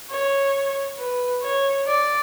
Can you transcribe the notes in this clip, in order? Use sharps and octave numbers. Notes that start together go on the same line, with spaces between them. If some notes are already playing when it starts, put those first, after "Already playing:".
C#5
B4
C#5
D5